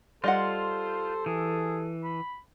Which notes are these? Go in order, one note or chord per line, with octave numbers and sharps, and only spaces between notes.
G3 F4 A4 C5 D#5 F#5
E3 G#4
B5